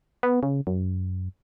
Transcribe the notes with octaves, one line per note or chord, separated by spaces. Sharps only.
B3
C#3
F#2